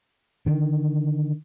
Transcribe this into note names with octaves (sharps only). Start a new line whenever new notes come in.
D3 D#3